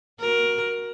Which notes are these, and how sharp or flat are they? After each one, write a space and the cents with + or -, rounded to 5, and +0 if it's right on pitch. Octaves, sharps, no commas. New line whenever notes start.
F#4 +0 A#4 +15